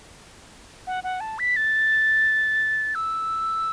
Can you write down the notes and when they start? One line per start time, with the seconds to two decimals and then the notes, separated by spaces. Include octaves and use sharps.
0.87 F#5
1.04 F#5
1.20 A5
1.39 B6
1.56 A6
2.95 E6